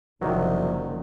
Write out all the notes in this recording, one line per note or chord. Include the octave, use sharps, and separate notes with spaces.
F#1 C2 C3 D#3 F3 F#3